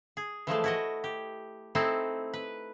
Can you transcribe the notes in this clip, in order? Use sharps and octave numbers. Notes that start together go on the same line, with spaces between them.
G#4
E3 F3 G#3 A3
E4 F#4 D#5
G4
A3 C4 D#4 E4
B4